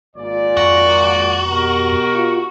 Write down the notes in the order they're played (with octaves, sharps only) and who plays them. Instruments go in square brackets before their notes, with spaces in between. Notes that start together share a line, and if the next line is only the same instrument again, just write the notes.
[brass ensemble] G#1 A#2 D5
[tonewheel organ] F2 A#5 C#6 [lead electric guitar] F#4
[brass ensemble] B2 G4 A#4
[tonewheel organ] F4 C#6